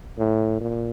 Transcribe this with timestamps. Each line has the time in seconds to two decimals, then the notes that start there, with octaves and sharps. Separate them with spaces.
0.18 A2
0.61 A#2